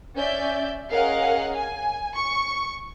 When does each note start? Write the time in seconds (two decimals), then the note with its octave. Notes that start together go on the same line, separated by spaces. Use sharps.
0.17 C#4 D5 E5 G6
0.91 C#4 G#4 A#4 D#5 F5 F#5
1.56 G#5
2.16 C#6